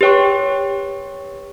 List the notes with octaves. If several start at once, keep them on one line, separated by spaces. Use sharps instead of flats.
G4 B4 C#5 G5 C#6